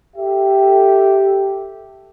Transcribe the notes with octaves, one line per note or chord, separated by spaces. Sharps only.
G4 A4 E5